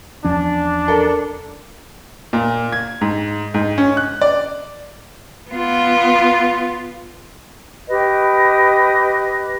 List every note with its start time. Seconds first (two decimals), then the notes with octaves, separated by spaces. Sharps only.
0.24 E2 F3 C#4 D4
0.88 A4 A#4
2.33 A#2
2.72 G#6
3.01 G#2
3.54 G#2
3.78 C#4
3.97 F#6
4.21 D5
5.50 B3 F4
7.87 G4 B4 D#5